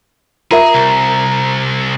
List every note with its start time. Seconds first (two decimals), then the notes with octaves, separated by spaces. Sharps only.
0.51 F4 G#4 A#4 E5 A#5
0.74 C2